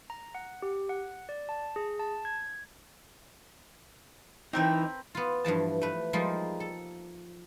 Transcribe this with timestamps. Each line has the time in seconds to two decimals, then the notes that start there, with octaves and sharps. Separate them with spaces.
0.10 A#5
0.35 F#5
0.62 G4
0.89 F#5
1.29 D5
1.49 A5
1.76 G#4
1.99 A5
2.25 G#6
4.53 E3 C4 D#4 A#4 B4
5.15 B3 F4
5.45 G2 E3 F3 A5
5.82 A3 B4
6.13 F3 G3 G#3 A#3 D#4 F4
6.60 A4